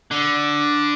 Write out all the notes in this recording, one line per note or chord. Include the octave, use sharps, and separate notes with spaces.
D3